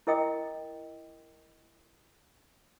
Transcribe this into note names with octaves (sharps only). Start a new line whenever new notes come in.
E4 A#4 D#5 G5 D#6